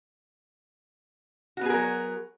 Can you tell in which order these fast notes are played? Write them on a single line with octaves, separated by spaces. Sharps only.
F#4 B3 G#4 A#4 F#3